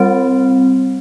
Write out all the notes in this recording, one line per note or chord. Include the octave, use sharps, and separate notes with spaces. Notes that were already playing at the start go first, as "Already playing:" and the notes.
Already playing: G3 C4